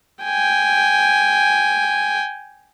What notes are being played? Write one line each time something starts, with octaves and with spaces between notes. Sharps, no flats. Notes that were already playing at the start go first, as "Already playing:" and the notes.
G5 G#5